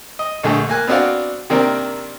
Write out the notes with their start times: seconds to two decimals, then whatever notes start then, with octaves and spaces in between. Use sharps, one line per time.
0.19 D#5
0.44 A#1 D3 A3 G#4
0.69 A#3 G#5 F#6
0.88 B3 C4 D4 F#4 D5 F5
1.50 C3 D#3 A#3 C4 D4 A#4